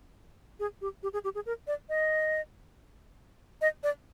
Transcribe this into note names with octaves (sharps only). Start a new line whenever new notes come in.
G#4
G4
G4
G#4
G4
G#4
A#4
D5
D#5
D#5
D5